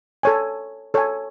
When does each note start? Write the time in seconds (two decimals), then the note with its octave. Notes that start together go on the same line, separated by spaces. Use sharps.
0.23 A4 C#5 G#5
0.94 A4 C#5 G#5